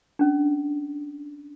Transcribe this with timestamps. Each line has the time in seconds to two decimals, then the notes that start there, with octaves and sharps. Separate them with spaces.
0.19 C#4 D4